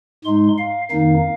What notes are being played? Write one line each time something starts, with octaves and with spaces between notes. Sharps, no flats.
G#2 G#3 D#4 C6
F5
F2 D#3 A#3 D#4 F5